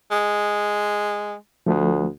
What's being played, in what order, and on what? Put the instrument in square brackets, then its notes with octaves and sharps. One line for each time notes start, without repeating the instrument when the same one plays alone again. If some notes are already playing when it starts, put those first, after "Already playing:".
[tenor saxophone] G#3
[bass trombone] D2 [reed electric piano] F3 A3